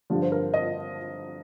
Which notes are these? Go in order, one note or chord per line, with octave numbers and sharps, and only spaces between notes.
G2 D3 F3
C5
A#4
D#5